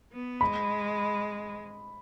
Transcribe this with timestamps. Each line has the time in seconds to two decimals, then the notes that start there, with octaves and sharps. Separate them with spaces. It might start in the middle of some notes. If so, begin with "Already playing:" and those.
0.12 B3
0.41 G#3 B5